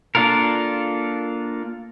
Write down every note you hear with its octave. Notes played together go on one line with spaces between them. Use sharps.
A#3 D4 F4 A4 A#4